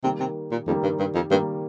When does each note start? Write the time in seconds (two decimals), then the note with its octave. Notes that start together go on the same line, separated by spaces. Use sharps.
0.04 C3 D#3 G3 A#3
0.20 C3
0.51 A#2
0.67 F2 D#3 G3 A#3
0.83 G2
0.99 G2
1.15 F2
1.30 G2 D#3 G3 A#3